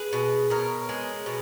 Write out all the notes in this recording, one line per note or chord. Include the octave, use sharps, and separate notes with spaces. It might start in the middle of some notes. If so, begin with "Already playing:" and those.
Already playing: G#4 B4
B2
B2 A#4 C#5
G#3
B2